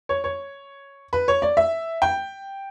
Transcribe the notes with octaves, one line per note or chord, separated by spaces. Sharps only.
C#5
C#5
B4
C#5
D5
E5
G5